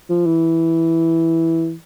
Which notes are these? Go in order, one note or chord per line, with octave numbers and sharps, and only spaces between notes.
F3
E3